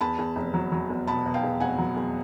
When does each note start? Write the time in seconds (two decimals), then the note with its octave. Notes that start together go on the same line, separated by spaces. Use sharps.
0.01 E2 A5 B5
0.18 E2
0.36 F1
0.54 F#3
0.72 F#3
0.90 E2
1.07 B2 A5 B5
1.26 B2
1.34 F5 G5
1.43 E2
1.60 F1 F#5 G#5
1.78 F#3
1.96 E2